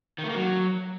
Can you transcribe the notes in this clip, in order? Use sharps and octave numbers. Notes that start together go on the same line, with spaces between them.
D#3
A3
A#3
F#3